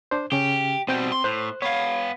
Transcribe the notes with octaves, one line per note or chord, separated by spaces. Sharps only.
D4 C5
C#3 C#4 G4
B2 G3 C4 G5
C6
A2 C5 F#6
B3 C#5 F5 B5 G#6